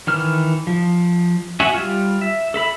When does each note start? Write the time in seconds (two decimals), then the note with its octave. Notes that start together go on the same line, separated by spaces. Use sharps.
0.07 D#3 E3 F6
0.67 F3
1.60 F#4 E5 G#5
1.73 G3 F4
2.21 E5
2.54 A4 E5 B5